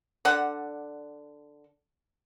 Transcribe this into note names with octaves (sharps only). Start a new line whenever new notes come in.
D3 D5 F#5